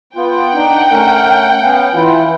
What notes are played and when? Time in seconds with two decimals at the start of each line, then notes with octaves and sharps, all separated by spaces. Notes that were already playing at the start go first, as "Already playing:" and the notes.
0.16 B3 F4 F#5 G5
0.55 D4 D#4
0.92 A3 C#4 A#4
1.62 B3 C#4 F5
1.95 E3 E4 F4